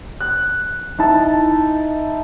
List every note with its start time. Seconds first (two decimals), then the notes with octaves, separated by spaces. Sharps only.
0.21 F#6
0.99 D#4 E4 A5